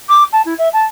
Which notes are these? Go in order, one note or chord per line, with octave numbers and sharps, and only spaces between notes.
D6
A5
E4
E5
A5